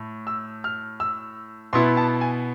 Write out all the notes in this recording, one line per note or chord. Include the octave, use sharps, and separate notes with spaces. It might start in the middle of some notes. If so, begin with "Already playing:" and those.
Already playing: A2
E6
F6
E6
B2 B3 E4 C6
A5
G#5